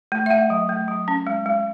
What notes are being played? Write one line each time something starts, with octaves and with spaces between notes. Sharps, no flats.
A3
E5
A3 F#5
F#3
A3
F#3
C#4
G#3
G#3